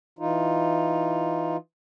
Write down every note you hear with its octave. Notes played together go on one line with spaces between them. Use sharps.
E3 D#4 F4